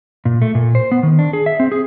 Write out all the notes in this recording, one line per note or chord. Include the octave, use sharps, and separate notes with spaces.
A#2
A3
A#2
C5
B3
D#3
D4
G#4
E5
C4
G#4